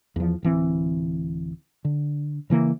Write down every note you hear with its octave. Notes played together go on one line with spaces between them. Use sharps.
E2 F3
D1 E3 C4
D3
C#3 E3 A#3